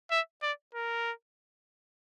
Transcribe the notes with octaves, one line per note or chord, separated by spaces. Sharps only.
E5
D5
A#4